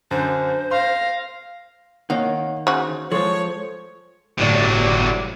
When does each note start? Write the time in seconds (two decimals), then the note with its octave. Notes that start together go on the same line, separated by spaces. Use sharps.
0.11 F#2 D3 C5
0.71 F5 C6 A#6
2.10 D#3 A#3 C#5 F#5
2.67 C#3 F#4 C5
3.12 F3 G#3 A4 C5 C#5
4.38 G1 A2 C3 F#3 D5